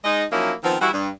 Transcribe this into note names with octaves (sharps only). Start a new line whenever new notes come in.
G#3 D#4 D#5
F3 F#3 A#3 C#4 D#4 E4
D#3 F3 B3 C4
E3 G3 E4 F#4
G2